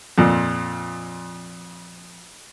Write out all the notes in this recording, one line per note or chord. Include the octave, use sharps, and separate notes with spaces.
F2 A#2